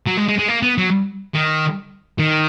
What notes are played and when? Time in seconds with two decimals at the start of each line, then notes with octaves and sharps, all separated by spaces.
0.06 F#3
0.17 G#3
0.28 G#3
0.38 G#3
0.48 A#3
0.63 B3
0.78 F#3
1.34 D#3
2.19 D#3